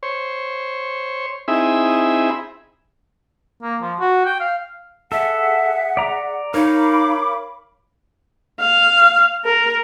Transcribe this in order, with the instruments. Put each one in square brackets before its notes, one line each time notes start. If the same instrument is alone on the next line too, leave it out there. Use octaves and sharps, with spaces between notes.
[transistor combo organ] C5 C#5
C4 D#4 E4 G#4 E5 B5
[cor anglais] A#3
F3
F#4
G5
F5
[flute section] G#4 F#5 [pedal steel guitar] A4 [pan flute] E5
[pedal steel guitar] D5 A#5
[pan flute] D#4 [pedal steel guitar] A#4 C#5 [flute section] F5 B5 D6
[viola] F5
A#4